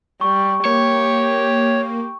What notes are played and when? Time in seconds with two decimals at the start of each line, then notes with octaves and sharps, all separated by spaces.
0.21 G3 C#6
0.65 A#3 G4 C#5